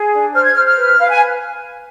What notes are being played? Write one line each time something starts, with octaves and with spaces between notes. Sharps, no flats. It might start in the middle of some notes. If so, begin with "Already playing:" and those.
Already playing: G#4
D4
C5 F6
G#6
C5 F6
F6
B4
B4 F5
G#5